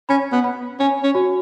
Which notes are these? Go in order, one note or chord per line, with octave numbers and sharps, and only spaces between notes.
C#4 B5
B3
B5
C#4 G#5
C#4
F#4